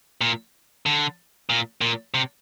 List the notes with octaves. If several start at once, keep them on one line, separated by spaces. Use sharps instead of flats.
A#2
D3
A#2
A#2
C3